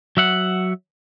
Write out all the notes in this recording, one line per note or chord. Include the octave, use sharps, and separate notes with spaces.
F#3 E5 F#5